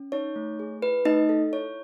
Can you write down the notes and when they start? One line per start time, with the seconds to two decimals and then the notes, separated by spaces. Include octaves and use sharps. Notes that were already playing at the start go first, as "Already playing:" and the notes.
Already playing: C#4
0.12 D#4 C#5
0.36 A3
0.59 G#4
0.82 E4 B4
1.05 A3 D#4 D#5
1.29 A4
1.53 E4 C#5